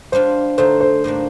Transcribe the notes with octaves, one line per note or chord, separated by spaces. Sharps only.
G3 D4 F4 C5
D3 A3 D#4 C5
C5
A2 G3 A#3 D4